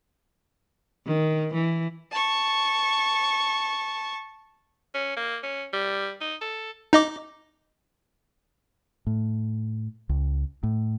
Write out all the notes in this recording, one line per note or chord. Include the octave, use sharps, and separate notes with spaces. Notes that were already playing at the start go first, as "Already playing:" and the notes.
D#3
E3
A5 C#6
C#4
A#3
C#4
G3
D#4
A4
D#4 D#5 D6
A2
C#2
A2